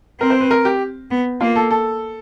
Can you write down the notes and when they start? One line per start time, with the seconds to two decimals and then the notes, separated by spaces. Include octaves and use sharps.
0.20 C4 A#4
0.30 C5
0.41 B4
0.51 A#4
0.65 G4
1.11 B3
1.41 A#3 F4
1.56 A4
1.71 A4